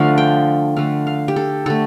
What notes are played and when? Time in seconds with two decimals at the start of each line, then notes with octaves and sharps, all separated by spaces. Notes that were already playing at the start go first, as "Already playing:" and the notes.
Already playing: D3 F3 A3 F5
0.18 G5
0.77 D3 A3 F5
1.07 F5
1.28 G4
1.36 A4
1.66 D3 A3 A4